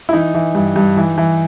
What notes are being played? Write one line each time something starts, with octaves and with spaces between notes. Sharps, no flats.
E4
E3 D#4
E3
G2
G2
E3
E3